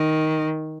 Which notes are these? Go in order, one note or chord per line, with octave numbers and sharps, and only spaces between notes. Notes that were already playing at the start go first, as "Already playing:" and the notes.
Already playing: D#3